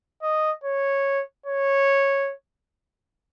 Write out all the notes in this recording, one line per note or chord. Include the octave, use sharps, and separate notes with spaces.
D#5
C#5
C#5